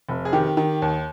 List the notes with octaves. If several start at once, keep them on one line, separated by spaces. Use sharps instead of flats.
F1
G#4
D#3 G4
D#3
D#2